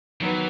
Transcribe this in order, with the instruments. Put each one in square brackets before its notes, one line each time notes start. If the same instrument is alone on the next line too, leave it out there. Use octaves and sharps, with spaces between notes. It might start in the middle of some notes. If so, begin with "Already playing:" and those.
[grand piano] D#3 F#3 B3 [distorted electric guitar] E3